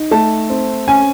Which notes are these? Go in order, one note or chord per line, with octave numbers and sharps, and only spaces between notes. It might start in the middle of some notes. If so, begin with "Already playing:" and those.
Already playing: D#4
A3 A5
C4
C#4 G#5